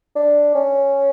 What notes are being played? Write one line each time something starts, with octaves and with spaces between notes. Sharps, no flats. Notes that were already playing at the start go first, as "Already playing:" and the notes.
D4
C#4